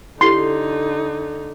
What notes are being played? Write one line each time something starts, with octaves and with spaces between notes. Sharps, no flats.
D3 D#4 E4 G4 A4 C6